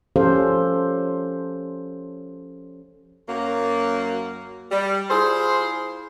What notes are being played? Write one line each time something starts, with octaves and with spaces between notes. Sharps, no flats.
F3 C#4 G4 A4 C5 F5
F#2 F#3 A#3
G3
E4 F4 G#4 C5